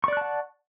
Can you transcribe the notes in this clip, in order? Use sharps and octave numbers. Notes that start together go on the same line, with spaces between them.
D5 F#5 A5 C#6 F#6